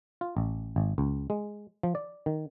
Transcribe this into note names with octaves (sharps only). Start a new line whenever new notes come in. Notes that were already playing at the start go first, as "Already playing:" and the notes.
F4
A1
G#1
C#2
G#3
F3
D5
D#3